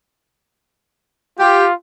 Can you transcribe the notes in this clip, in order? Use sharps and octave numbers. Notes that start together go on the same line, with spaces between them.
F4 G4